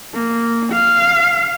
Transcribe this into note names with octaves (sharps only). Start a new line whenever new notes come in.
A#3
F5